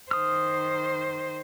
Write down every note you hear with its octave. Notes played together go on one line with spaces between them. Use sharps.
D#3 C5 D#6 F6